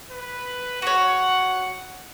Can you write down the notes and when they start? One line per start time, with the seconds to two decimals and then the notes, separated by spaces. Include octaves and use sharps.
0.10 B4
0.82 F#4 C#5 F#5